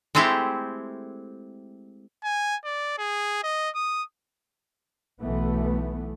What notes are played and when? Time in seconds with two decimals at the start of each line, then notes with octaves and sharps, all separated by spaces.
0.15 G#3 A3 C4 E4 G4
2.24 G#5
2.65 D5
2.98 G#4
3.43 D#5
3.75 D#6
5.21 B1 E3 A3 B3